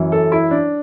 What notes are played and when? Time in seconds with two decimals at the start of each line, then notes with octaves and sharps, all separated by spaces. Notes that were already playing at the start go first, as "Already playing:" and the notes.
Already playing: F#2 E3
0.12 A4
0.32 E4
0.51 D4